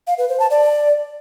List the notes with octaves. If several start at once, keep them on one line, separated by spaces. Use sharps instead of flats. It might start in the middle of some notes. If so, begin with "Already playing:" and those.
F5
B4
C5
A5
D5